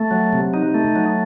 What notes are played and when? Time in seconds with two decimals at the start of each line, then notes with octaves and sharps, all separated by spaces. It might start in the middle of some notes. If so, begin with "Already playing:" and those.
Already playing: A3
0.11 F#3
0.33 C3
0.54 D#4
0.74 A3
0.96 F#3